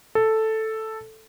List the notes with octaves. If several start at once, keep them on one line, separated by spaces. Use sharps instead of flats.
A4